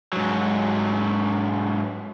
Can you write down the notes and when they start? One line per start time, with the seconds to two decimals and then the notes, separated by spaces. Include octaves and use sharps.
0.13 G#2 F#3